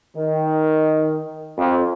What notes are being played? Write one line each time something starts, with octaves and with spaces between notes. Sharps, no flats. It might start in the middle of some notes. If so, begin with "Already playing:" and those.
D#3
F2